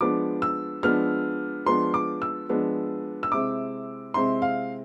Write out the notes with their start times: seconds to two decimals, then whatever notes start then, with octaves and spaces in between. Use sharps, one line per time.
0.01 F3 G#3 B3 D4 D6
0.42 E6
0.83 F3 G#3 B3 D4 F6
1.66 F3 G#3 B3 D4 C6
1.94 D6
2.22 E6
2.49 F3 G#3 B3 D4
3.23 E6
3.32 C3 G#3 C4 E4 D6
4.14 C3 G#3 C4 E4 C6
4.42 F5